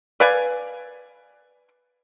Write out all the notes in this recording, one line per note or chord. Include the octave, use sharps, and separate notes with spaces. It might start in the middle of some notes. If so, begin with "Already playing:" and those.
B4 D5 F5 G#5